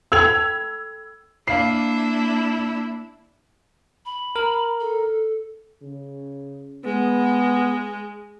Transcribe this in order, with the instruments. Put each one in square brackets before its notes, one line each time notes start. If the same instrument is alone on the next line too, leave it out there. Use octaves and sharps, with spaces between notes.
[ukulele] A4 G5 B5 [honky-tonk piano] E6 G#6 F7
[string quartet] A#3 D4 E4 [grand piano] F5 C7
[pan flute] B5
[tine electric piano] A#4
[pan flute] A4
[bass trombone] C#3
[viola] G#3 [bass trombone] B3